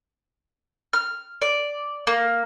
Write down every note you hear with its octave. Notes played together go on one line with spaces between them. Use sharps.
F6
D5
A#3